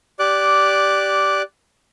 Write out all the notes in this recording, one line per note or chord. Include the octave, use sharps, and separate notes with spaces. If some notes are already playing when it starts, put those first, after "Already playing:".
G4 D5 D6 F#6